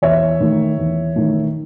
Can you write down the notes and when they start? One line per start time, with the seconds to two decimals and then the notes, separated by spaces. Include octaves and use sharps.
0.02 E2 C#5 E5
0.40 D#3 A3
0.78 E2
1.16 D#3 A3